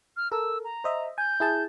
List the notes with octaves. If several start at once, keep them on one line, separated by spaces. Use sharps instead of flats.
F6
A4 A#4 E6
A#5
C5 D#5 E5
G#5 G6
E4 G#4 A5